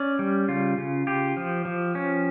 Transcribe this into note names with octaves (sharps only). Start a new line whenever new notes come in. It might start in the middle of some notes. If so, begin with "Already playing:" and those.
Already playing: C#4 D5
G3
C#3 F4
C#3
F4 G4
F3
F3
C#4